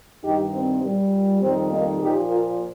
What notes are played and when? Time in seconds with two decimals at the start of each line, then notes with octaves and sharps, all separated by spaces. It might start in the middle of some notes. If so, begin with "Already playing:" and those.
0.24 G2 D#3 G3 D#4 G4
0.54 C4
0.84 A#2 G3
1.42 F2 D#3 G3 C4
1.71 A#3 D#4
2.01 A#2 F3 D#4 G4
2.30 F4 A#4